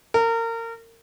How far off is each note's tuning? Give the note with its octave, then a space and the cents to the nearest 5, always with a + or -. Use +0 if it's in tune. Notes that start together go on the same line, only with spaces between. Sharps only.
A#4 -30